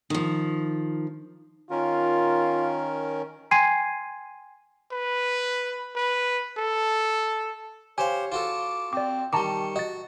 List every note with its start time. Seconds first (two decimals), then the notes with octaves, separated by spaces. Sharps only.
0.10 D#3 F3
1.70 D#3 C#4 F4 A#4
3.51 G5 G#5 C6 G#6 C7 D#7
4.92 B4
5.96 B4
6.58 A4
7.98 G4 C5 C#5 F5 G#5
8.32 F4 F#4 A4 D6
8.93 C4 D5 D6
9.33 D#3 G3 A5 A#5 C#6 D6
9.76 F#4 D#5 A6